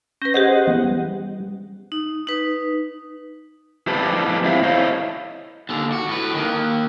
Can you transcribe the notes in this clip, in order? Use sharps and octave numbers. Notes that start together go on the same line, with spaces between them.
C#4 B4 G6 A#6
G4 G#4 C5 D#5 F#5 G6
E3 B3 F#5
G3
D#4
D#4 B4
F2 E3 G4 B4 C5 A5
C4 E4 C5 E5 F5
E4 C5 C#5 D#5 F5
D#2 D3
F#4
A2 B4
D#3 A#3